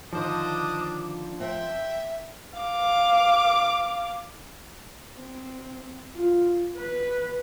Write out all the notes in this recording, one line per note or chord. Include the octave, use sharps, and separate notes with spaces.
D3 D#3 F3 D4 C5 D#5 D6
C4 E5 G5
F5 D6
C4
F4
B4